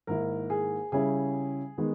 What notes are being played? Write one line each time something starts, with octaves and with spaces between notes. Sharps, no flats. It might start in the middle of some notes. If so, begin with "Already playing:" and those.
G#2 D#3 A#3 E4 A#4
G#4
C#3 G3 C#4 E4 G#4
D#3 G#3 B3